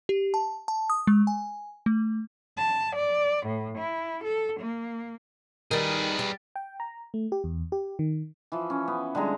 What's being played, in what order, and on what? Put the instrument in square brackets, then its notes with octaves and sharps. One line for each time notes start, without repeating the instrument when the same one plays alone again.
[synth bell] G4
A5
A5
D#6
G#3
G#5
A3
[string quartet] A5
D5
A2
E4
A4
A#3
[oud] D#3 G3 [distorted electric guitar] G#4 B4
[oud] G3
[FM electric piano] G5
A#5
A3
G4
E2
G4
D#3
[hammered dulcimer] E3 F3
C#4
B3
D3 G3 G#3 A#5